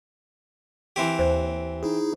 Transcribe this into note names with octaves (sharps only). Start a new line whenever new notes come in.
E3 C4 G4
D#2 C5
D#4 E4 G#4